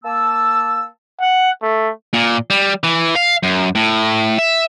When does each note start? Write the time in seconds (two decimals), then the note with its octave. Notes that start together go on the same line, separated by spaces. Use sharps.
0.04 A#3 A5 E6
1.21 F#5
1.62 A3
2.14 A#2
2.50 G3
2.84 E3
3.15 F5
3.43 F#2
3.75 A2
4.39 E5